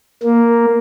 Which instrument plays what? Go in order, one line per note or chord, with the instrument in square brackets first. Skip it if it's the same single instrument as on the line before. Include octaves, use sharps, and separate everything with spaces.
[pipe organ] A#3